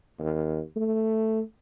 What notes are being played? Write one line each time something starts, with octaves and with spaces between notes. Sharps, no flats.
D#2
A3